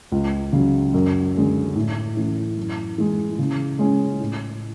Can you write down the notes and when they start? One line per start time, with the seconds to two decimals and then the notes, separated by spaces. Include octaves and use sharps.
0.12 C#2
0.53 C#3 F#3
0.94 F#2
1.35 D3 G#3 C#4
1.76 A2
2.17 E3 A3 C#4
2.57 F#2
2.98 E3 G#3
3.39 C#3
3.79 G#3 C#4
4.20 A2